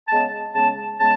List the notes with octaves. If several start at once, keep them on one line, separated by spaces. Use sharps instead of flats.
C#3 G#3 B3 A5
C#3 G#3 B3 A5
C#3 G#3 B3 A5